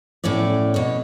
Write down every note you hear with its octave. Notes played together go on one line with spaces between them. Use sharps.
E2 A2 C#4 C#5 D5
B2 C#5